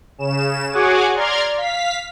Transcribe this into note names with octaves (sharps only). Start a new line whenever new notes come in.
C#3 E7
F#4 G#4 C#5 F#5 G#5 D6
D5 A#5 C6 F6 G#6
F5 B6